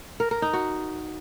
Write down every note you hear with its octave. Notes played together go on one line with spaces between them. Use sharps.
A#4
A#4
D#4
F#4